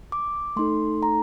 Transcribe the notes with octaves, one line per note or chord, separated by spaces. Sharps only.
D6
A3 D#4 A4 C6
A#5